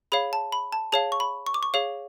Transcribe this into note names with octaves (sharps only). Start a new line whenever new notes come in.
G#4 C#5 F5 B5
A5
B5
A5
G#4 C#5 F5 A5
C#6
B5
C#6
D6
C#6
G#4 C#5 F5